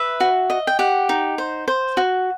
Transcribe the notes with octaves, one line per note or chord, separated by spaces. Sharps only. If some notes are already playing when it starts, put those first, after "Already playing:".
Already playing: B4 E5
F#4
D#5
G5
G4 F#5
D#4
C5
C5
F#4